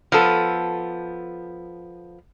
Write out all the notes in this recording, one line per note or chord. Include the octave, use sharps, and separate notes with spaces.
F3 B3 A4